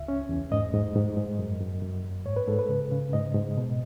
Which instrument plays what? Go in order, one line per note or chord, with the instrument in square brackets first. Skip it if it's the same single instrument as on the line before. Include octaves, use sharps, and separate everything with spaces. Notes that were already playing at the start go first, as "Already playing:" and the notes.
Already playing: [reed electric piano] C#2 E5
C#4
E2
G#2 D#5
G#2
G#2
G#2
F#2
F#2
F#2
F#2
G#2 C#5
B4
G#2 A4
B4
C#3
C#3
G#2 D#5
G#2
B2